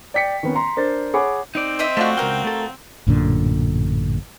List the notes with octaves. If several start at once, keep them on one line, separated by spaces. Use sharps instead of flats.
D5 G5 B6 C#7
D#3 B3 C#4
A#5 C6
D4 A#4 C5 A6
G#4 C#5 F#5 B5 D6
C4 D#4 D5
C5 D#5 E5
F3 A3 D4 F#4
C#2 A#4 F5 G5
A3 A4
A1 F#2 A#2 D3